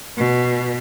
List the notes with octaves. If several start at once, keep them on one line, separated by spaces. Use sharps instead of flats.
B2